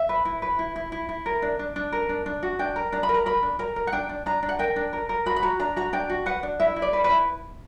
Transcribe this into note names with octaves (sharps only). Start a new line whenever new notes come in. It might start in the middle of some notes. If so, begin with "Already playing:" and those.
Already playing: E5
B4
E4
B4
E4
E4
E4
E4
A#4
D4
D4
D4
A#4
D4
D4
F#4
D4 G5
A#4
D4 A#5
B5
A#4
A#5
A#4 B5
D4
A#4 A#5
A#4
F#5
D4 G5
D4
D4 A#5
D4
F#5
A#4 G5
D4
A#4
A#4
F#4 B5
B5
F#4 A#5
D4 A#5
F#4 A#5
D4 G5
F#4
B4 F#5
D4
E4 E5
E4
D5
B4
B4
E4